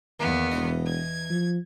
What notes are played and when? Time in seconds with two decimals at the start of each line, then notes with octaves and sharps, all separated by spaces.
0.20 E2 D#3 A#3 B3
0.51 E1 E3 D#5
0.85 G#6
1.30 F3